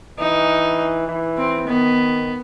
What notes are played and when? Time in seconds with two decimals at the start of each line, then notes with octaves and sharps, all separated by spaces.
0.19 E3 D#4
1.08 E3
1.38 C4
1.67 D#3 B3